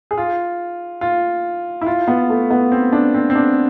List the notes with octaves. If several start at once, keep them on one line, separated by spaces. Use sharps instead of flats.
G#4
F4
F4
E4
F4
B3
A3
B3
C4
D4
C4
C4
D4